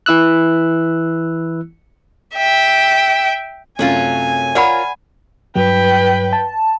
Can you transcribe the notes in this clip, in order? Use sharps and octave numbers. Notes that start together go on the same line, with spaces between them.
E3 E4 E6 F#6
E5 G5
F#2 C3 F#3 A3 C#4 F4 G#5
F4 A#4 C#5 D5 F#5 B5
G2 F#3 B4 G5
A5